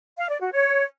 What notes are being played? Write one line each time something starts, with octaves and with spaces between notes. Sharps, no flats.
F5
D5
F#4
C#5